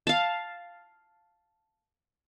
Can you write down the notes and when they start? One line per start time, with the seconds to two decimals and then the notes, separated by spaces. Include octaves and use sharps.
0.07 F5 A5